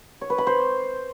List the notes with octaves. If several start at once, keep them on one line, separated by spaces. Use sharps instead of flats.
C#5
B4
B5
C5